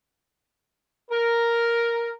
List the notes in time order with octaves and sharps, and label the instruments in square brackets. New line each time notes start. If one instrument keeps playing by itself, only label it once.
[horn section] A#4